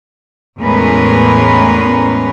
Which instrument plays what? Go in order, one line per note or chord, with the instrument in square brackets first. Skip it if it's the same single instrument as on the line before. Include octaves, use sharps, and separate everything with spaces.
[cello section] E2 A2 G#3 C#4 A#4 B4